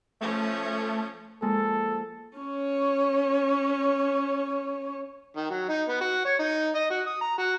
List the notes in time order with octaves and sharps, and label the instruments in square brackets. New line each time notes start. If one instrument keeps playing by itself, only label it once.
[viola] F3 C#4 [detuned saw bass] A3
[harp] F3 G#3 A#3 [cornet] A4
[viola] C#4 C#5
[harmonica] D#3
F#3
D#4
B3
F#4
C#5
D#4
D#5
F#4
D#6
A#5
F#4